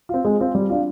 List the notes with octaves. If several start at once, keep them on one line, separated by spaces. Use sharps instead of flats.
C4 F4
G#3
C4 F4
G3
D4 F4